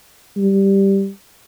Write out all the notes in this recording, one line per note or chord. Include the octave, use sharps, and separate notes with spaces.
G3